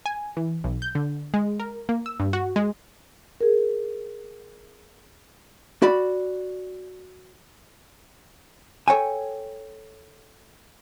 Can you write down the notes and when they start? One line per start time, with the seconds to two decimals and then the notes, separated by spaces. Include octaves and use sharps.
0.06 G#5
0.37 E3
0.64 B1
0.82 G6
0.95 D3
1.34 G#3
1.60 A#4
1.89 A#3
2.06 E6
2.20 G2
2.33 F#4
2.56 G#3
3.41 G#4 A#4
5.82 F#4 D5 B5
8.88 A4 C#5 G5 G#5